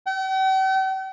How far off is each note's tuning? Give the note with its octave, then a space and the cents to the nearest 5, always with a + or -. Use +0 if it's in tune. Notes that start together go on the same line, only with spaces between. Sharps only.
G5 -45